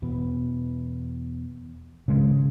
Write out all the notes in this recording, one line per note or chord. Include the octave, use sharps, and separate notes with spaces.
E2 B2 B3
G#1 C#3 G#3